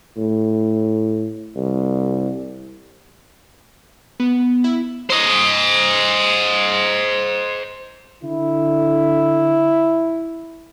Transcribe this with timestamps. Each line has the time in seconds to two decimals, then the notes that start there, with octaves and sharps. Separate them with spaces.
0.17 A2
1.56 C2
4.20 B3
4.64 E4
5.10 C5 D#5
8.24 D3 E4